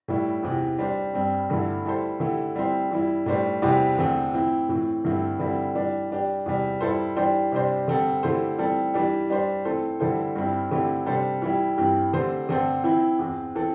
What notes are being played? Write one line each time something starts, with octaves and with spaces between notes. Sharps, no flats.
A2 G3 E4
E2 C3 E3
G3 D4 C5
G2 G3 C4
G2 D3 A3 E4
G3 E4 A4 C5
D3 A3 E4 G4
G3 C4 E4 C5
E3 G3 E4
A2 G3 D4 C5
E2 C3 G3 E4 C5
E2 D3 A3 C4
E3 C4 E4
A2 E3 C4
G2 D3 A3 C4 E4
D3 G3 C4 E4
E3 G3 D4
G3 D4 G4
E2 C3 G3
G3 E4 A4 C5
E3 G3 D4 G4 C5
C3 G3 D4 C5
D3 G3 C4 A4
D3 A3 E4 G4 C5
E3 G3 C4 A4
E3 G3 D4 G4
G3 D4 C5
E3 A3 C4 A4 C5
D3 G3 E4 A4 C5
G2 G3 C4 E4
D3 A3 C4 E4 G4
C3 G3 D4 A4 C5
E3 G3 E4 G4
G2 E3 C4 G4
D3 A3 C4 G4 C5
D3 C4 A4 C5
E3 C4 E4
E2 E3 C4
E3 C4 A4